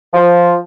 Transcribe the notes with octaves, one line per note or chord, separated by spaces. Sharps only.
F3